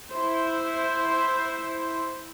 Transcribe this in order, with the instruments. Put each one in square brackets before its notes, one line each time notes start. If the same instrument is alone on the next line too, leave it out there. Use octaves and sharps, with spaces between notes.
[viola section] E4 C5